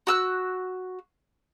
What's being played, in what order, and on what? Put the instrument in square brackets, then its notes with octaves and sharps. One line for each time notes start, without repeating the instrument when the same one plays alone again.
[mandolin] F#4 E6 F#6